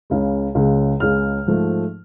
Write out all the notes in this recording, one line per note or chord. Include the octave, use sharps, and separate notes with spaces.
C#2 C#3 G#3
C#2 C#3 G#3
C#2 C#3 G#3 F6
G#2 F3 A3